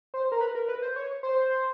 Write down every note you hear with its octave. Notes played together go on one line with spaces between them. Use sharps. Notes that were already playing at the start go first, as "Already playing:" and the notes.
C5
A#4
B4
A#4
B4
C5
C#5
C5